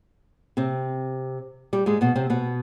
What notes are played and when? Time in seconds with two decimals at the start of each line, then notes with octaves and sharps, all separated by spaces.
0.57 C3 C4
1.73 G3 G4
1.86 G#2 G#3
2.01 B2 B3
2.15 C3 C4
2.30 B2 B3